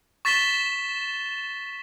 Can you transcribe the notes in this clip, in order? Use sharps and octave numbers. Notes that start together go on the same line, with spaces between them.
C#6 A6 B6 E7 G7